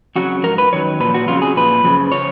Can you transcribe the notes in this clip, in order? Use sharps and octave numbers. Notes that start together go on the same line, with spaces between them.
F2 C#3 F#3 F#4
G#2 F3 A#4
B4
F#2 D#3 F#3 C#5
A#2 F3 B4
F#4
F2 C#3 F#3 F4
G#4
A#2 F3 B4
F#2 C#3 F3
C#3 F3 C#5